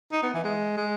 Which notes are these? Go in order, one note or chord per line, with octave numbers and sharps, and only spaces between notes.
D#4
B3
E3
G#3
G#3